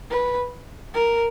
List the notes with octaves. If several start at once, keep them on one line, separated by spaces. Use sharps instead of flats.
B4
A#4